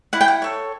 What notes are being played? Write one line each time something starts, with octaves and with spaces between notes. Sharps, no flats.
E4 F#5
G5
F#5
A4 C#5